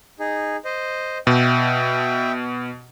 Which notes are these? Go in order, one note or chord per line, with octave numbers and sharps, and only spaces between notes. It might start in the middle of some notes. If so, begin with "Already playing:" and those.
D#4 G#4
C5 D#5
B2 E5 G5